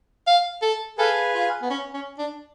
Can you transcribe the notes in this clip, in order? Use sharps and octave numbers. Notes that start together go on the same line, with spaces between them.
F5
A4
G#4 A4 B4 F5 G#5
F4
B3
C#4
C#4
D4